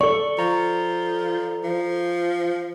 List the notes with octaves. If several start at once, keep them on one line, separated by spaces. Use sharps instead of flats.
A4 D5 C#6
F3 A#5
F3